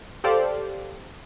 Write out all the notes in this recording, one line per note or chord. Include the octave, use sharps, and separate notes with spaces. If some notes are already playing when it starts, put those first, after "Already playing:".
G4 A4 C5 D5 F5